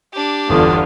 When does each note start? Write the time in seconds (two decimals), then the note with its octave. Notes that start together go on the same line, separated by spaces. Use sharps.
0.13 D4 G4
0.49 G1 E2 D3 B3 F4 A4 D#6